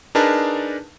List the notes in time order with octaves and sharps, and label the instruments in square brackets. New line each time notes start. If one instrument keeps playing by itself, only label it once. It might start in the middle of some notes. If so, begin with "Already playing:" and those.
[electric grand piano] D4 D#4 G#4 A#4 B4 A5